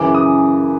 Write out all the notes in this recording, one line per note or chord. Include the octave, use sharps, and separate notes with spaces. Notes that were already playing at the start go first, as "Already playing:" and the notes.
Already playing: F#2 C#3 E3 D6
D#6